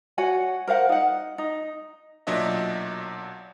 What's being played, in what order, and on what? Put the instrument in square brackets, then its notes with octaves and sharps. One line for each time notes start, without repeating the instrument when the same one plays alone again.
[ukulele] F#4 C#5 F#5 G#5
A#4 C5 F5 F#5
D#4 F#5
D#4
[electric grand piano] B1 A#2 F#3 D4 D#5 E5